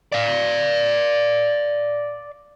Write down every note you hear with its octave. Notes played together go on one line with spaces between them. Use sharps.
D5 F5